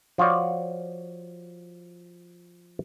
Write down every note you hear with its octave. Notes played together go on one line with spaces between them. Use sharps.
F3 F4 F#4 C#5 D5